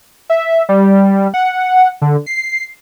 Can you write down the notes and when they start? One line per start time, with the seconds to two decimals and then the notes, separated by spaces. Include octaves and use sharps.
0.30 E5
0.69 G3
1.34 F#5
2.02 D3
2.26 C7